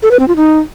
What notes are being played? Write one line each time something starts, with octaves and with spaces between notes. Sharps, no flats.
A4
B4
C4
F4
D#4